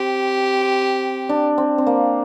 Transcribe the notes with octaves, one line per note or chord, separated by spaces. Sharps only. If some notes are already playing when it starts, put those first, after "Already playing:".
Already playing: C4 G4
D4
C4
C4
A#3